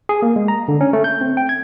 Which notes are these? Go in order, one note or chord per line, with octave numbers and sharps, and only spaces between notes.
G#4
A#3
G#3
A#5
D3
C#4
A3
G6
C4
G5
G#6